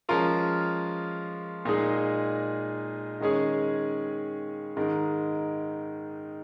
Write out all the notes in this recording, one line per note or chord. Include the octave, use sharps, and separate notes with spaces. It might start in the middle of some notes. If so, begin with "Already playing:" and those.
F3 G#3 C#4 F4 A#4
A#2 G#3 D#4 G#4
D#3 G#3 C#4 G#4
G#2 D#3 G#3